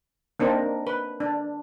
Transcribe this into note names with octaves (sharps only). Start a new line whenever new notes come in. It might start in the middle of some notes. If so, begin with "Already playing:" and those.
A#3 C4 D4 D#4 A#4
B4
D4